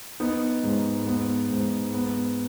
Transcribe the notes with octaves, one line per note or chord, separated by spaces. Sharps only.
B3 D#4
G#2
B3
G#2
B3